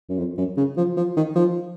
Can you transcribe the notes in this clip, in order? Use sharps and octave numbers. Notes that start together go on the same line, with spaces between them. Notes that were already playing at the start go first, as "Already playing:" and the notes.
F#2
F2
F#2
C#3
F3
F3
D#3
F3